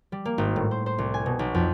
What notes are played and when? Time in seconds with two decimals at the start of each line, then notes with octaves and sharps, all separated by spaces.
0.12 G3
0.25 A#3
0.38 G#1
0.56 A2
0.71 C5
0.86 C5
0.98 C2
1.14 G#5
1.26 B2
1.39 B1
1.55 F2